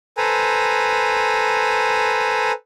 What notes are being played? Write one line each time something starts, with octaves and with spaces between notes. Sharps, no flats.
A4 B4 C5 G#5 A#5